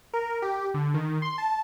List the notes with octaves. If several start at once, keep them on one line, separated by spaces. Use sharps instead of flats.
A#4
G4
D3
D#3
C6
A5